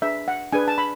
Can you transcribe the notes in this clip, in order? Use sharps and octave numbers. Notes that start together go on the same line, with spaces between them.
D4 G#4 B4 E5
F#5
D4 G#4 B4 G#5
A5
B5